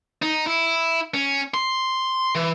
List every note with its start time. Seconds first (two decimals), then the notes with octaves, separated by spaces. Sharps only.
0.22 D#4
0.46 E4
1.14 C#4
1.54 C6
2.35 E3